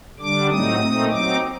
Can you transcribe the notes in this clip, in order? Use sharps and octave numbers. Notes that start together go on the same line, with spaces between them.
D3 G3 D4 D6
A2 F#3 A3 C4 D#4 D#6
A#2 A3 C4 D#4
F#3 C4 D#4 D6